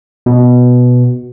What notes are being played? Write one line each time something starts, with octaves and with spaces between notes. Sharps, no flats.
B2